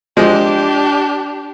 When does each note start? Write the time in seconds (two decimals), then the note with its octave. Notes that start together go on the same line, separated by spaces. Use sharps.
0.17 F3 G#3 D4 G4